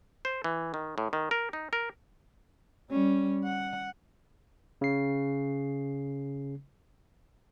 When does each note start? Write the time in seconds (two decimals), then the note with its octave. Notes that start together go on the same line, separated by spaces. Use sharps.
0.25 C5
0.44 E3
0.74 D#3
0.98 A2
1.13 D#3
1.31 A#4
1.53 D#4
1.73 A#4
2.90 G3 C#4
3.44 F#5
4.81 C#3 C7